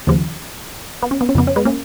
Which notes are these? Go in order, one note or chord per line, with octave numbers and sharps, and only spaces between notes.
D#2 C#3 F3
B3
C#4
B3
C#4
F2 C#3 F3 B3
C#4
G#3 B3
A#3 C#4